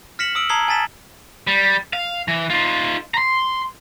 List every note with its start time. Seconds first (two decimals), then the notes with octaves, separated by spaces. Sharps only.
0.19 F6 A#6 B6 C#7 E7 F#7
0.35 D#6 E6 D7 F#7
0.49 A5 A#5 D#6 G#6 C7 G7
0.68 G#5 A5 A6 B6 E7
1.47 G3
1.93 F5
2.28 E3
2.50 D#4 F4
3.14 A#5 C6